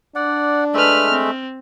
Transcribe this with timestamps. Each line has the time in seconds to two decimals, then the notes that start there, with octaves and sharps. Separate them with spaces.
0.15 D4 D5 F#5
0.74 G#3 A3 B4 E5 F6
1.11 C4